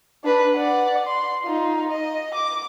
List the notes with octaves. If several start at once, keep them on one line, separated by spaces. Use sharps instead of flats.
D4 B4
D5 F#5
C6
D#4 F4
D#5
D6